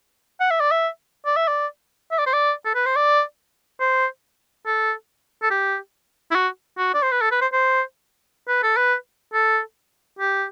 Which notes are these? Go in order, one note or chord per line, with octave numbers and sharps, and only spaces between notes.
F#5
E5
D5
E5
D5
E5
D5
E5
D5
C5
D5
A4
B4
C5
D5
C5
A4
A4
G4
E4
F#4
F#4
D5
C5
B4
A4
B4
C5
C5
B4
A4
B4
A4
G4